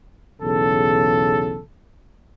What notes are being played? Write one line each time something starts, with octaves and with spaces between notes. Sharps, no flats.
B1 E2 C#3 A4